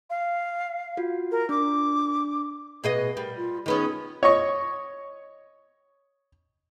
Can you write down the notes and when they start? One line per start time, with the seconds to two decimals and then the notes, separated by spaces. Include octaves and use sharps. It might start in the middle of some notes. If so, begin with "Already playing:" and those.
0.09 F5
0.97 F4 F#4
1.31 A#4
1.49 D4 D6
2.84 B2 G#4 B4 D#5
3.17 G3 A#4
3.36 F4
3.66 D#3 B3 C#4 G#4
4.23 C#5 D#5 C#6